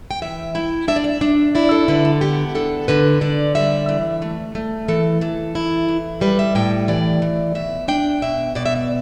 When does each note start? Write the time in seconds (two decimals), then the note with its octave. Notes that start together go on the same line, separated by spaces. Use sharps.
0.11 G5
0.22 E3 E5
0.55 E4 G5
0.88 D4 E5
0.96 D5
1.04 E5
1.21 D4
1.55 E4 D5
1.71 A4
1.88 D3 B4
2.05 A4
2.21 B3 G4
2.55 D4 A4
2.88 D3 B4
3.21 D3 D5
3.55 G3 E5
3.89 E3
4.22 A3
4.55 A3
4.88 E3 A4
5.21 E3 A4
5.55 E4
5.88 E3
6.21 G3 B4
6.39 E5
6.55 A2 G5
6.88 E3 D5
7.22 E3
7.55 B2 E5
7.88 D4 G5
8.22 B2 E5
8.55 B2 D5
8.66 E5
8.76 D5